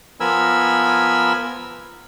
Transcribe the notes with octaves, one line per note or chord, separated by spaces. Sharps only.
F3 B3 A#4 G#5 B5 E6